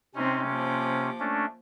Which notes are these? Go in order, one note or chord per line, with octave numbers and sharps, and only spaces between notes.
C3 C4 C#4 D#4
F3 A#3 D6
A3 C#4 D4